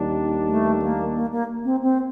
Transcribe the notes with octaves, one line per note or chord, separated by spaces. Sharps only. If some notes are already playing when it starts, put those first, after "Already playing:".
Already playing: D#2 D#3 G3 D4
A3
A#3
A#3
A#3
C4
C4